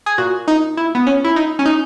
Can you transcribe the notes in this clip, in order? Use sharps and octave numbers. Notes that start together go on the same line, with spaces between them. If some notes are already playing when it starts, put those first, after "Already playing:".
G#4
A#2 F#4
D#4
E4
B3
C#4
E4
D#4
C#4
D#4